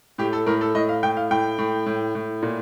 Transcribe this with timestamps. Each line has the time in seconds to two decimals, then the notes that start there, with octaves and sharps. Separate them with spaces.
0.18 A2 G4
0.33 A4
0.46 A2 A#4
0.61 A4
0.75 A2 D#5
0.89 F5
1.03 A2 G5
1.17 F5
1.31 A2 G5
1.58 A2
1.86 A2
2.15 A2
2.43 A#2